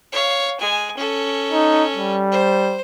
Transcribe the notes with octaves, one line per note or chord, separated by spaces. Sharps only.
C#5 F5
G#3 G#5
C#4 A4
D#4
G3
C5